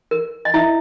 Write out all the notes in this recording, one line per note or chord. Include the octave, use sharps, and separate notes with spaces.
A#4
D#5
E4 E5